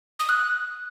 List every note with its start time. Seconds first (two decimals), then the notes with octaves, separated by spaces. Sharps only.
0.19 D#6
0.29 F#6